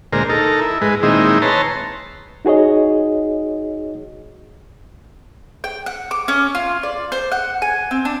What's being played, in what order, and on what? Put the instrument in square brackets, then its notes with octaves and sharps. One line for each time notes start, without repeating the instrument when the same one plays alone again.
[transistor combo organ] D2 A#2 G#3 A#4 C5
D#4 A4 A#4
E4
G#2 G#3 B4
A#2 D#3 G#3 C4 D#4 E4
B4 C#5 A5 A#5 C6
[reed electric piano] D#4 F#4 G#4 C#5 D#5
[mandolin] G5
F#5
D6
C#4
F4
D5
C5
F#5
G#5
C4
D4